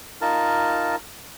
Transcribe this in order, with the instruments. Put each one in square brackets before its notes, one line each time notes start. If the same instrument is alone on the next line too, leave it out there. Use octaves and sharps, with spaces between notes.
[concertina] D#4 F4 A#4 A5